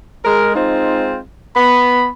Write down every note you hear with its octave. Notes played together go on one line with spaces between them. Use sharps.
G#3 A#4
G#3 C4 D#4 F4
B3 B5